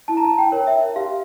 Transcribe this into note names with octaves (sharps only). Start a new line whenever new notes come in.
E4 A5
A#5
A5
G5
A#4 C#5
E5
G4 F5